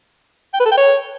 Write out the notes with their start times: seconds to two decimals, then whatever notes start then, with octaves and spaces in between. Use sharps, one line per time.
0.54 G5
0.60 B4
0.65 A4
0.71 G5
0.77 C#5